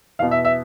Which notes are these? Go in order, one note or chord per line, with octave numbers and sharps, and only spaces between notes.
E2 B2 F5
E5
E5